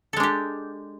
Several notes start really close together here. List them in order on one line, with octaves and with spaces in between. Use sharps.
A4 G#3 D4 G4